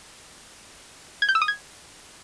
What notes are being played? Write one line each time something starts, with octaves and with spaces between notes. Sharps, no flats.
G#6
G6
E6
D#6
G#6